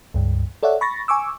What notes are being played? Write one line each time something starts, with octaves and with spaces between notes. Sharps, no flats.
C#2 G2
A4 C#5 D5 E5 F#5
B5 C#6 A6 A#6
G#5 C#6 D6 E6